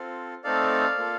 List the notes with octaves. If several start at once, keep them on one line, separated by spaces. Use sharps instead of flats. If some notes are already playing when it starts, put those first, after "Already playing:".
Already playing: C4 F4 A4
A3 C4 D#4 A4 D5 F5
A#3 F4 A4